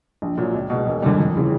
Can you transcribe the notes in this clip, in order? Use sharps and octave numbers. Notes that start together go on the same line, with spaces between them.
A#1
A#2 F#3
C#2
B2 G#3
E1
D#2 D3 G3
F2
C#3 E3